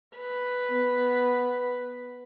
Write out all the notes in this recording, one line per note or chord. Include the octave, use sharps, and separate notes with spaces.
B4
B3